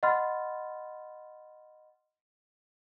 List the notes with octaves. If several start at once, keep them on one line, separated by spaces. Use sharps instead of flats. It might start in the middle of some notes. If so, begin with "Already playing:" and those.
D#5 F#5 B5 C6 F6 A6